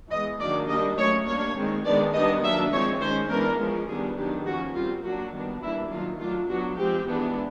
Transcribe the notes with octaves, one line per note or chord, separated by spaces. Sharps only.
E3 G#3 B3 D#5
D#3 F#3 A#3 D4 D5
G3 A#3 D4 D#5
F#3 A3 C#4 C#5
G3 A#3 D4 C#5
D#3 G#3 C4
D#3 G#3 B3 D4 D5
D#3 G3 B3 D4 D#5
F#3 A#3 D4 E5
F3 G#3 C4 C#5
D#3 G#3 C#4 C5
E3 G#3 B3 D4 A#4
F3 G#3 C#4
D#3 G3 B3 D4 G#4
D#3 F#3 B3 D4 G4
F3 A#3 C#4 F#4
G3 C4 F4
F#3 A#3 D4 F#4
D#3 G3 B3 D4
E3 G3 A#3 D4 E4
D#3 F#3 A#3 F4
F#3 A3 D4 F4
F#3 B3 D4 F#4
F3 G#3 C4 G4
E3 G#3 B3 D4